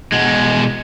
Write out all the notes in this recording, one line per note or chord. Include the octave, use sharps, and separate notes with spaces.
B2 G#3